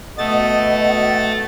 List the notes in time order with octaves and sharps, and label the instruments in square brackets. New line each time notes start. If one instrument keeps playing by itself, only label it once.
[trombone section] B2 [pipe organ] A3 A6 [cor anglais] D#5 [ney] F#5